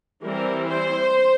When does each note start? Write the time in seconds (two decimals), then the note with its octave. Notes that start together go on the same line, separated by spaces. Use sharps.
0.24 E3 G3 C4 E4 A#4
0.68 C5